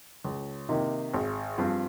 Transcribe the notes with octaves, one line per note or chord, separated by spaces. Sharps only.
C#2
C3 D#3 A#3 D#4
G#1
G2 F3 C4 F4